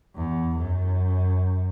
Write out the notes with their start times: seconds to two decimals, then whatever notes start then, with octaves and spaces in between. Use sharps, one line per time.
0.15 E2
0.56 F#2